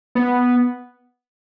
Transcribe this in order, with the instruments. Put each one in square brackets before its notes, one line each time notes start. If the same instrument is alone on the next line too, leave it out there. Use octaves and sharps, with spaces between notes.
[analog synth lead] B3